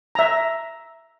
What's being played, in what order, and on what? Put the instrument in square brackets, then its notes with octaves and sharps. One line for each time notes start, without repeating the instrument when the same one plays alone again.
[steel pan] E5 A#5